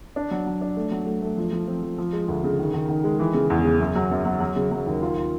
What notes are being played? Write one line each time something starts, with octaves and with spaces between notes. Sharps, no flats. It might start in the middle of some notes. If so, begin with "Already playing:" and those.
D4
F#3
F#3
D4
A3
F#3
A3
A3
F3
F3
C4
F3
F3
G#3
D2
C#3
D#3
D#3
D#3
G#3
E3
C#3
E2
C#3
F#2
F#3
F#2
F#3
F#3
C#3
F#3
D#2
F4
F4